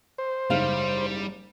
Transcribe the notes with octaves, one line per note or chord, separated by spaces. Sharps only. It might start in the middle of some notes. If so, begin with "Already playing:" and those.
C5
F#1 G#2 G3 F5